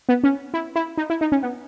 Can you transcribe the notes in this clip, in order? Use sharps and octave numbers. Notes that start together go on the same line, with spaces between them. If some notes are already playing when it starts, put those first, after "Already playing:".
B3
C#4
E4
E4
D#4
E4
D#4
C#4
B3